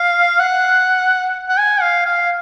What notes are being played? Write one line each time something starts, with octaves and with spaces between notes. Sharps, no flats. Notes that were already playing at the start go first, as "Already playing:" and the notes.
Already playing: F5
F#5
F#5
G#5
F5
F5